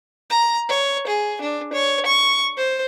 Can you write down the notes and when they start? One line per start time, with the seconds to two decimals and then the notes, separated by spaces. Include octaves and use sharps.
0.30 A#5
0.70 C#5
1.07 G#4
1.42 D4
1.73 C#5
2.06 C#6
2.57 C5